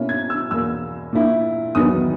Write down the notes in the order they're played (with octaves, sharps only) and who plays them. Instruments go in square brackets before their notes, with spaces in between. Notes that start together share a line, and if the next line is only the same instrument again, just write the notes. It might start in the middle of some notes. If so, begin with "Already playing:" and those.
Already playing: [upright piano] B2 A#3 C#4 E4
G#6
E6
E2 B2 A#3 E6
A#2 A#3 E4
E2 D#3 F#3 B3 D#6